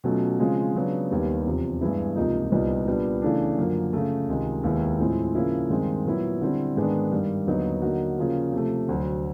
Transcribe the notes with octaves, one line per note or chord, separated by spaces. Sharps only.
B2 F#3 A3 C#4 F4
C#3 F3 G#3 C4 F4
C#3 F#3 B3 D4
D#2 D#3 G3 B3
E2 C3 F3
G2 E3 G#3 B3 E4
C#2 C3 F3 A#3 D#4
C2 A#2 G3 B3 D#4
A#2 G3 B3 D4
C#3 E3 A3 D4
F#2 D3 F3 A#3
C#3 F3 A3
C#2 C3 D#3 G#3 C4
D#2 D#3 G#3 B3 E4
A2 F3 G#3 C4 E4
C#3 F3 A#3 C#4 E4
G2 D#3 G#3 C4
A#2 F#3 B3 E4
D3 G3 C4 E4
G#2 D#3 G#3 B3 D4
G2 D#3 G3
D#2 D3 F#3 B3 D#4
D3 F#3 A#3 D#4 F#4
C#3 F3 A#3 C#4 F4
C3 F3 A3
D2 D3 F#3